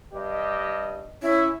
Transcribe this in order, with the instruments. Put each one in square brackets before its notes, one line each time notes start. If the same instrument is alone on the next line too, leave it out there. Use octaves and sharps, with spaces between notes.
[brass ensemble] G2 G4 D#5
[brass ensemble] C#4 [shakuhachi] E4